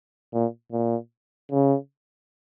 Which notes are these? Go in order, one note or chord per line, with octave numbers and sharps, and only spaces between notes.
A#2
A#2
C#3